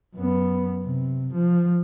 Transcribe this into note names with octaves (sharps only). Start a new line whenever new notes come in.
F#2 B3
C3
F3